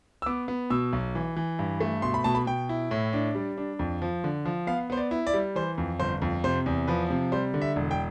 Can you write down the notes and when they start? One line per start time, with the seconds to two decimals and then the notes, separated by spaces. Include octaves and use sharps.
0.22 E6
0.26 B3 D6
0.48 B3
0.70 B2 E6
0.93 B1
1.15 E3
1.37 E3
1.59 G2
1.81 A3
2.02 B2 C6
2.14 B5
2.24 B2 A5
2.35 B5
2.47 B2 G5
2.69 E4
2.91 A2
3.13 D4
3.35 G3
3.58 D4
3.79 F2
4.02 F3
4.24 D3
4.45 F3
4.67 B3 F5
4.90 B3 C5
4.97 D5
5.11 E4
5.27 D5
5.34 G3
5.55 E3 C5
5.78 F2
6.00 G1 C5
6.22 F2
6.44 C3 C5
6.66 E2
6.88 F3 B4
7.10 C3
7.32 G3 C5
7.54 D3
7.62 E5
7.76 E1
7.91 G5